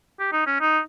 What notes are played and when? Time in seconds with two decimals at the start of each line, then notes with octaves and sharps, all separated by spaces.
0.20 G4
0.33 D#4
0.47 C#4
0.60 D#4